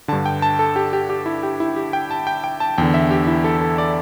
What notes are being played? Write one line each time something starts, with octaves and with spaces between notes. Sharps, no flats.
G2 D3 A5
G5
A5
A4
G4
G4
G4
E4
G4
E4
G4
G5
A5
G5
G5
A5
E2 D3 G5
E5
G4
E4
A4
A4
D5